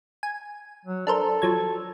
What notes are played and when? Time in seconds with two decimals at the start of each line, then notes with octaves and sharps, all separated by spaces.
0.23 G#5
0.85 F#3
1.07 D4 A4 A#4 C5
1.42 F3 F#3 G#6